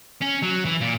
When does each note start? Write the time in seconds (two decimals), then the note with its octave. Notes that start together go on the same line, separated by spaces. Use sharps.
0.22 C#4
0.43 F#3
0.65 E3
0.81 A#2